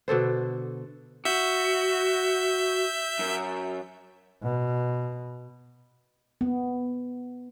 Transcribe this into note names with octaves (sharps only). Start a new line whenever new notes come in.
B2 D3 A4 C5
F#4 E5 G6
F#2
B2
B3